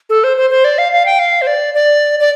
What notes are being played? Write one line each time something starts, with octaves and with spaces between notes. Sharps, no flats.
A4
C5
C5
C5
D5
F5
F5
G5
F5
C5
D5
D5
D5